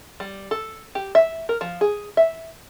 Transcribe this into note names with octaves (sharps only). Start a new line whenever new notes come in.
G3
A4
G4
E5
A#4
F3
G#4
E5